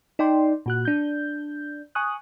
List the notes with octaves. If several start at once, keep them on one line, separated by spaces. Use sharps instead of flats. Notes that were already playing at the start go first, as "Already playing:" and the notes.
D#4 D5 G5 C6
A#2 F#4 F#6
D4 G6
G#5 C#6 D#6 F#6